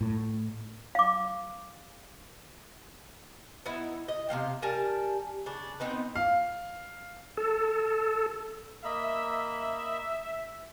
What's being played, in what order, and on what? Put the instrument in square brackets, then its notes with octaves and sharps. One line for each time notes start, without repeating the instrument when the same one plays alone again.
[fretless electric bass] A2
[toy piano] F5 D6
[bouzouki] B3 D#4 E4
D#5
C3 G#3 F5 G5
G3 A#4 G#5 A5
C#3 D4
B3 C4 D#4 B4
[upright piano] F5
[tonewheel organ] A4
[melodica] A#3 D#5 B5 [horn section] E5